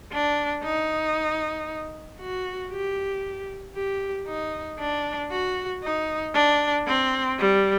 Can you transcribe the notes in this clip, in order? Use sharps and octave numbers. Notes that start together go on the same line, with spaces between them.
D4
D#4
F#4
G4
G4
D#4
D4
F#4
D#4
D4
C4
G3